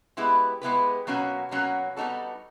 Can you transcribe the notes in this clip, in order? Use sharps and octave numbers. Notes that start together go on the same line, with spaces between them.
G#3 B3 E4 G4 B4
G#3 B3 E4 G4 B4
B2 F#3 A#3 C#4 F#4
B2 F#3 A#3 C#4 F#4
G3 B3 D#4 F#4 A4